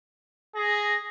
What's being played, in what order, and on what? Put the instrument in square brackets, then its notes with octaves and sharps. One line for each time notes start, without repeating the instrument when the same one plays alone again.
[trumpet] G#4 [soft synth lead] A#6